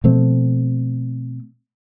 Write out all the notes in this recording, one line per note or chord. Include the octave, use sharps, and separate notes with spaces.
B2 F3 A3 C4